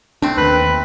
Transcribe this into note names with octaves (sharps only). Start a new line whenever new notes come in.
A3 C4 D4
D#2 D#3 B4